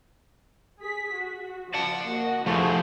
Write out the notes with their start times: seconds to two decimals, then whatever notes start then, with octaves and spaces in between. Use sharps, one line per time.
0.80 G#4 B6
1.15 F#4
1.74 F3 F#5 A5
2.07 A#3 F#4 D#5
2.46 F3 A3 E4 G#4 C5